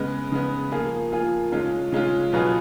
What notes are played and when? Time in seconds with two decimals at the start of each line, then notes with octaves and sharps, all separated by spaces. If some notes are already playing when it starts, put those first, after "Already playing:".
Already playing: C#3 G#3 B3
0.32 C#3 G#3 B3
0.72 F3 A#3 F4 G#4
1.12 F3 A#3 F4 G#4
1.52 C#3 G#3 C#4 F4
1.92 C#3 G#3 C#4 F4
2.33 B2 F#3 B3 F4 G#4